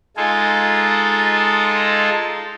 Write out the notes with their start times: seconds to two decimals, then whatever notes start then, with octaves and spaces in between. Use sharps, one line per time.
0.17 G#3 D#4 F4 G#4 A4